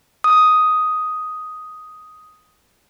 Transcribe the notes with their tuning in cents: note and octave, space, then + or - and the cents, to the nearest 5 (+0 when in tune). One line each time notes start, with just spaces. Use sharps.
D#6 +5